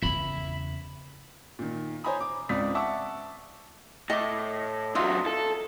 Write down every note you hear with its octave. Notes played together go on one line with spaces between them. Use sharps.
E2 C#3 E5 B5
A#2 D#3
C5 C#5 G#5 A#5 B5 D#6
D6
C#2 G#2 C4 D5 D#6 B6
E5 F#5 A5 C#6 D6 E6
A2 D#5 D6
E2 F#3 F4 D#5 E5
A4